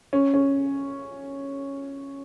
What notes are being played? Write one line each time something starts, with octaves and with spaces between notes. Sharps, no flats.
C#4
C#4